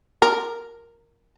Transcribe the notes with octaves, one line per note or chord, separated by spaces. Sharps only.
A#4